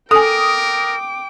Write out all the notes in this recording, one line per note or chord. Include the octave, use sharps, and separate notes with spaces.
A4 A#4 G5 G#5 D6 D#6